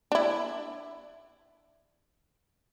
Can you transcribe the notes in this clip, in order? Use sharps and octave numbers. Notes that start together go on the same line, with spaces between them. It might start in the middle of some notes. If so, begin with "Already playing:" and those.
D4 E4